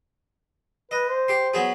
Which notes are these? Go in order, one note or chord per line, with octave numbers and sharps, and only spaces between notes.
B4 D#5
C5
G4 C6
F#3 B3 G#4